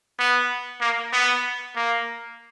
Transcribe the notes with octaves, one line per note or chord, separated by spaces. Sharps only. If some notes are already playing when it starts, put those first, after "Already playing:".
B3
A#3
B3
A#3